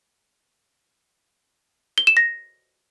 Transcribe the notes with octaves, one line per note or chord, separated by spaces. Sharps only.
G7
E7
A#6